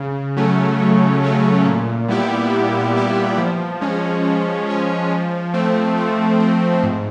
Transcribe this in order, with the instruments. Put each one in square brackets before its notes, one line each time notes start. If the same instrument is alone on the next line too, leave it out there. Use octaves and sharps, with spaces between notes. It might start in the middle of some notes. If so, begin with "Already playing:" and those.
Already playing: [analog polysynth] C#3
F#3 A3 C#4
C#3
F#3 A3 C#4
A#2
G3 B3 E4 G4
A#2
G3 B3 E4 G4
F3
G#3 C#4
F3
G#3 C#4
F3
A3 C4
F3
A3 C4
G#2